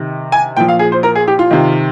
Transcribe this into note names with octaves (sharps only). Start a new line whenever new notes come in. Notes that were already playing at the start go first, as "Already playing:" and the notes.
Already playing: C3 D#3
G#5
A#2 F3 G5
F5
G#4
C5
A#4
G#4
G4
F4
C3 D#3